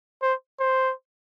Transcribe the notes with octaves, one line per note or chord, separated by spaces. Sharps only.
C5
C5